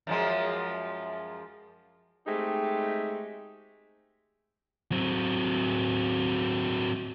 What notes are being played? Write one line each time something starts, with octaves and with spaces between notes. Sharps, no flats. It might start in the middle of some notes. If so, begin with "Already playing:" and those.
F#2 F3 G#3
G#3 A3 C4 D#4 G4
F#3 C4